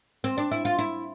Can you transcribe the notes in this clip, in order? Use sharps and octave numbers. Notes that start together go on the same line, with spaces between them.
C4
D4
E4
F4
E4